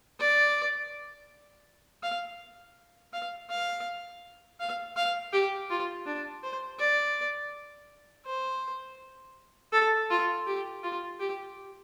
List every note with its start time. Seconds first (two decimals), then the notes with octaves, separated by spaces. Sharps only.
0.20 D5
2.03 F5
3.13 F5
3.50 F5
4.60 F5
4.97 F5
5.33 G4
5.70 F4
6.06 D4
6.43 C5
6.79 D5
8.26 C5
9.72 A4
10.10 F4
10.46 G4
10.83 F4
11.20 G4